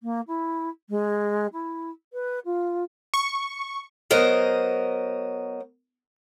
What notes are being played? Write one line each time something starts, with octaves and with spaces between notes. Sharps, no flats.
A#3
E4
G#3
E4
B4
F4
C#6
F#3 B3 A#4 C5 D#5